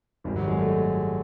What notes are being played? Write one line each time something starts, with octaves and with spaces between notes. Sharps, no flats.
G#1 F#2 D#3 G3
F#3
G#3
A3